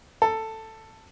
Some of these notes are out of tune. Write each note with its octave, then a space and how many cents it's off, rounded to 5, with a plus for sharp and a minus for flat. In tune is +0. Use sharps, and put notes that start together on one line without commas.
A4 +10